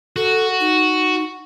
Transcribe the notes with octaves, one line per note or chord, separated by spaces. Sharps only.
F#4 A4
D#4